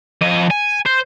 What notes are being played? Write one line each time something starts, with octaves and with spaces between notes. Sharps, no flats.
F2 D#5
G#5
C5